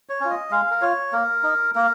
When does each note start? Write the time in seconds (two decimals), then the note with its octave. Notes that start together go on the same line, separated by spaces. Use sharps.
0.09 C#5
0.21 C#4 F4
0.30 D#5
0.50 G#3 F5
0.71 A#4
0.81 F4 C#5
1.13 A#3 A#4
1.43 D#4
1.75 A#3 A#4